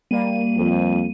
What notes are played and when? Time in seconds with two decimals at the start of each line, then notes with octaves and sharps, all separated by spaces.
0.11 G3 A#3 D#7
0.57 F2